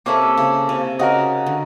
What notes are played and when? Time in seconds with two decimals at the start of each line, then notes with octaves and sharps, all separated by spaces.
0.06 C3 A#3 C#4 E4 A4
0.37 C#3
0.69 C3
0.99 C#3 D#4 F#4 A#4
1.46 D3